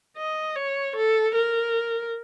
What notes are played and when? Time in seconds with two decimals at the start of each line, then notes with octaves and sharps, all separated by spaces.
0.17 D#5
0.55 C#5
0.95 A4
1.34 A#4